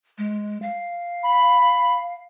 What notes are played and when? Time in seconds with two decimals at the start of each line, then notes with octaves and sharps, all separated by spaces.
0.18 G#3
0.62 F5
1.23 B5